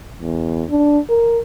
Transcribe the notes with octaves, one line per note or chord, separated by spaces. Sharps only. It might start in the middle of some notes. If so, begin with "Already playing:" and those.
E2
D4
A#4